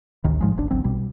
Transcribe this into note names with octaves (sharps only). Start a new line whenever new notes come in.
A1 D2 D#3
G#2 F3 G#3
D1 G1 G#2 D4
G#1 D2 F#3 C4
B1 B2 G3